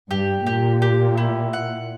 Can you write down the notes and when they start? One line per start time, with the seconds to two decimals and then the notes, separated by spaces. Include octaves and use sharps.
0.11 G2 G4
0.47 A#2 G4
0.82 G4
1.17 E4
1.53 F#5